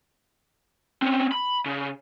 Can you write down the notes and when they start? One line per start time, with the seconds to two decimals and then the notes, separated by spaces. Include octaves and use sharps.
1.02 C4 C#4
1.32 B5
1.66 C#3